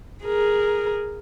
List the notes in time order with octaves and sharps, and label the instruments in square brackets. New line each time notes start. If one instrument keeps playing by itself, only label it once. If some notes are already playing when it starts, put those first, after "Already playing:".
[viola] G#4 A#4